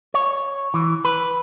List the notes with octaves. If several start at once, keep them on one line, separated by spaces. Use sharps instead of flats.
C#5
E3
B4